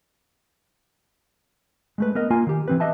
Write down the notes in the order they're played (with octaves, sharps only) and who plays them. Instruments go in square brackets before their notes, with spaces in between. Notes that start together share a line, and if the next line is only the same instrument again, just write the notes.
[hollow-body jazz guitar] G#3 A3 B4
B3 A#4 D#5
A#3 F4 G#5
D#3 G4
E3 C4 B4
G4 B4 D#5 E5 A5